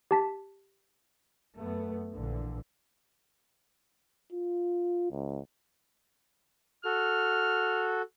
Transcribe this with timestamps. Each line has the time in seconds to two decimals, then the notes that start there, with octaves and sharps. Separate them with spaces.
0.11 G4 A5 B6
1.56 F#2 A3 B3
2.14 A#1 A#2 D3 E3
4.32 F4
5.11 C#2
6.85 F#4 A4 F6